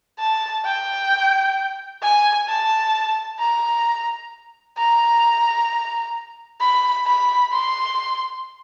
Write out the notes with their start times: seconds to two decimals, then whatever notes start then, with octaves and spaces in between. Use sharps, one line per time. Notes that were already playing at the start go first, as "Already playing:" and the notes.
0.19 A5
0.65 G5
2.03 G#5
2.48 A5
3.40 A#5
4.78 A#5
6.61 B5
7.07 B5
7.52 C6